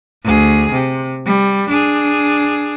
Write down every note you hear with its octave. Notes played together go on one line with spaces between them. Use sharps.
D2 G#4
C3
G3
D4 G#4